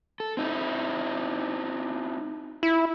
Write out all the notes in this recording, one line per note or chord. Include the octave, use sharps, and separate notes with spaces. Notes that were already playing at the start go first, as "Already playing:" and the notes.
A4
C4 D#4 E4
E4